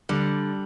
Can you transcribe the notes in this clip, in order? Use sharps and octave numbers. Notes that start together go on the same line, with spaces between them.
D3 G3